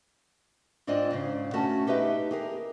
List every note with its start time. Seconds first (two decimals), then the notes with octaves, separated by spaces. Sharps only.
0.87 G#2 C4 D4 F4 D5 D#5
1.11 G#2 C#3
1.53 A3 C#4 F#4 A#4 A5
1.87 D#4 G4 B4 D#5 E5
2.31 G4 G#4 A#4